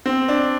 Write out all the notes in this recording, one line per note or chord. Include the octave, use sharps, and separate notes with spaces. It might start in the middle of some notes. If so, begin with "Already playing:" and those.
C4
D4